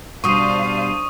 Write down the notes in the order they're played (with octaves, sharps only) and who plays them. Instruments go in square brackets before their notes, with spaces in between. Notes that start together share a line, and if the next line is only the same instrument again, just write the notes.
[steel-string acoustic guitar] B2 G3 [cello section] D4 C5 F5 [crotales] C#6 D#6 D#7